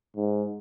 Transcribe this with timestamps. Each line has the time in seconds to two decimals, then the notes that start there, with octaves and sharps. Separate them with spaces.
0.16 G#2